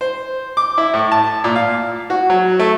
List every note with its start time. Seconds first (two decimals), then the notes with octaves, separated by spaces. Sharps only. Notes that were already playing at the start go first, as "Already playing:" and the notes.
0.01 C5
0.57 D6
0.78 E4
0.94 A2
1.12 A5
1.44 A#2
1.56 F5
2.10 F#4
2.30 F#3
2.59 A3